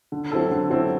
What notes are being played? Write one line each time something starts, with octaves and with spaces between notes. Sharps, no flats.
D3
F#3 C4 E4 A4
D3
F#3 C4 E4 A4